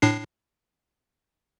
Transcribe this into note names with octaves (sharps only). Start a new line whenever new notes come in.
A2 D4 C7